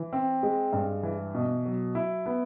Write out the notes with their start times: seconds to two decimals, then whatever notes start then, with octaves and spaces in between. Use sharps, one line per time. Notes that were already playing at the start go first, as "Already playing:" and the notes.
Already playing: E3
0.13 C4
0.43 G#3
0.73 G2
1.03 E3
1.35 B2
1.65 F#3
1.95 E4
2.26 B3